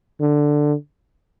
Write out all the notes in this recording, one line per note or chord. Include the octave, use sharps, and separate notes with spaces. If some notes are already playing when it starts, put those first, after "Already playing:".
D3